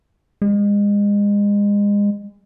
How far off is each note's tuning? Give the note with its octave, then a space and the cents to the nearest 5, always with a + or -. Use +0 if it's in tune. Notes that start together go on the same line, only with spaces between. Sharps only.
G#3 -30